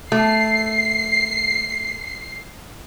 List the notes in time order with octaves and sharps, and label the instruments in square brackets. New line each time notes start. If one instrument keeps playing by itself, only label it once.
[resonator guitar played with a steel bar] A3 [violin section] C7